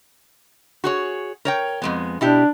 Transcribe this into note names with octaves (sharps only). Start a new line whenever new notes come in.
F#4 G#4 C#5
A#4 C#5 G5
F2 G#3 B3
B2 D4 E4 G4